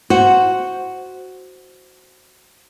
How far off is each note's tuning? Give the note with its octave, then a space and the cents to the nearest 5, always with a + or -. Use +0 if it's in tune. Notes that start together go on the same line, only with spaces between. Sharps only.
F#4 +0 C5 +0